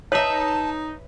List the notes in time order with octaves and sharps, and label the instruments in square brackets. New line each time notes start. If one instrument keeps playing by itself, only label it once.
[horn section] D#4 [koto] B4 E5 [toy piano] C#5 [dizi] A5